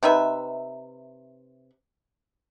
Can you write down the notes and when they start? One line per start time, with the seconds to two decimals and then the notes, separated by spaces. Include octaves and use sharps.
0.03 C3 D#4 B4 E5